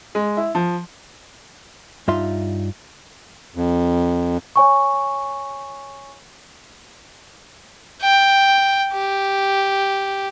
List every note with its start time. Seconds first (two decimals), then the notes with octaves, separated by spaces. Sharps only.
0.15 G#3
0.37 E4
0.55 F3
2.08 G2 D#4 F4 E5 C6
3.55 F2
4.56 C#5 G#5 C#6
8.01 G5
8.93 G4